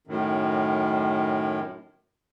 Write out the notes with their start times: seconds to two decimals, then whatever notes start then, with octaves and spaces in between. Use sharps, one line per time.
0.07 F#2 A2 D#3